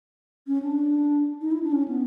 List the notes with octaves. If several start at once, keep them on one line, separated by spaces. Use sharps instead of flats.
C#4
D4
D#4
E4
D4
C#4
B3